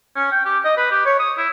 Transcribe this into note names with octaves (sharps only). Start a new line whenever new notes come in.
C#4
G5
G4
D#5
B4
G4
C#5
D#6
E4